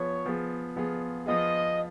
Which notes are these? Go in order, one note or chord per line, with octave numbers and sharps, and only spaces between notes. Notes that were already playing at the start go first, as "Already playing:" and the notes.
Already playing: F3 B3 F4 G#4 C#5
F3 B3 F4 G#4
F3 B3 F4 G#4
F3 B3 F4 G#4 D#5